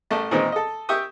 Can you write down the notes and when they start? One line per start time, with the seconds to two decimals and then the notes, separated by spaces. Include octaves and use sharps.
0.11 A1 A3 A5
0.31 A#2 D#3 E3 G#3 C4
0.52 A4 D#5
0.89 G4 E5 G5 C#6 D#6